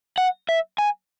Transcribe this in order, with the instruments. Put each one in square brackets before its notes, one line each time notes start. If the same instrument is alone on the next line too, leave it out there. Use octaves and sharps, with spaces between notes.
[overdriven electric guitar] F#5
E5
G#5